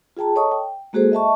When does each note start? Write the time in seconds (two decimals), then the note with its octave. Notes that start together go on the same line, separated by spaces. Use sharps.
0.17 F4 G#4 G5 A5 A#5
0.36 A4 C#5 D#5 A5 C#6 D#6
0.52 G5
0.93 G#3 A#3 F#4 G#4 A4 C5
1.12 D#5 E5 A5 C#6